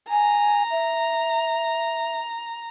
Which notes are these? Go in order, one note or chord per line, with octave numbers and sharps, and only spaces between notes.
G#5 A#5
E5